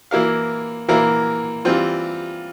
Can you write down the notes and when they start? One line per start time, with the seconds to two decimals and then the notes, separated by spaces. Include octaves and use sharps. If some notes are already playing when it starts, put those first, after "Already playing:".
0.11 E3 A#3 E4 A#4 F5
0.88 E3 A#3 E4 A#4 F5
1.65 E3 G3 C4 F4